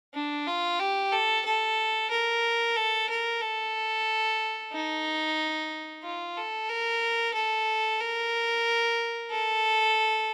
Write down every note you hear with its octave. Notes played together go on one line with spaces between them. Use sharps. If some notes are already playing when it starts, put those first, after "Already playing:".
D4
F4
G4
A4
A4
A#4
A4
A#4
A4
D#4
F4
A4
A#4
A4
A#4
A4